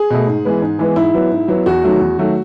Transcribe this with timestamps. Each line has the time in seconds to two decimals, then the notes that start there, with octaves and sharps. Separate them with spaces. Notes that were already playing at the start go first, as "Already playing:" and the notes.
Already playing: G#4
0.10 B2 A3
0.27 G#2
0.45 E3 G#3 B3
0.62 G#2
0.79 E3 G#3 B3
0.96 G#2 E4
1.14 F#3 B3
1.31 G#2
1.48 F#3 B3
1.66 E2 F#4
1.84 D#3 F#3 A3
2.00 E2
2.18 D#3 F#3 A3